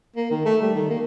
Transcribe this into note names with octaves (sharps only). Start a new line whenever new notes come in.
A#3
D#3
A3
G3
D#3
A#3